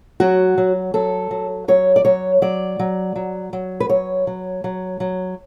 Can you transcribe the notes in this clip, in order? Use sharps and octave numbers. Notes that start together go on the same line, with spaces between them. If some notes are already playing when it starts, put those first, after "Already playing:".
F#3 F#4
F#3
F#3 A4
F#3
F#3 C#5
D5
F#3 C#5
F#3 D5
F#3
F#3
F#3
B4
F#3 C#5
F#3
F#3
F#3